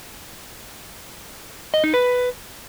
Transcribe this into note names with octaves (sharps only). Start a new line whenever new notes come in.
D#5
D#4
B4